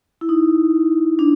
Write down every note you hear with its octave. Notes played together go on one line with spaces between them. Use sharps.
E4
D#4
D4